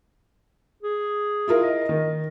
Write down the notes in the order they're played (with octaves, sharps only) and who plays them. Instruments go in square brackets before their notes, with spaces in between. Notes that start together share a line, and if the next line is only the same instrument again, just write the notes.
[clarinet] G#4
[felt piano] E4 F4 A#4
[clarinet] D#5
[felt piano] D#3